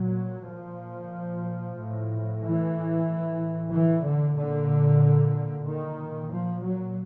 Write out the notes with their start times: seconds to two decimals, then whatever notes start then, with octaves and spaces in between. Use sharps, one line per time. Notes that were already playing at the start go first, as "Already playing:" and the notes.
Already playing: A#2 F#3
0.48 A#2 F3
1.78 A2
2.42 E3
3.06 A2
3.71 E3
4.04 D3
4.36 A#2 D3
5.65 A#2 D#3
6.31 F3
6.63 F#3